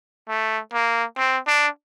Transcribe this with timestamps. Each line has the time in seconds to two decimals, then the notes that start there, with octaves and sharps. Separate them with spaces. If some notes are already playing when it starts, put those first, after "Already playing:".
0.28 A3
0.73 A#3
1.17 C4
1.47 D4